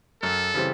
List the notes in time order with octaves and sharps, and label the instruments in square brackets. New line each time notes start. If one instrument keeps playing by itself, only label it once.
[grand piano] F#2 [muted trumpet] A4
[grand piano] C#3 E3 G3 C4